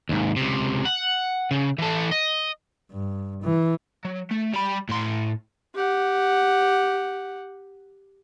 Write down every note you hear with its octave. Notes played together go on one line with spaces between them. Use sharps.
D#2 G#2
C#2 C3
F#5
C#3
E3 A4
D#5
G2
E3
F#3
A3
G3 B5
A2 C6
G4 F#5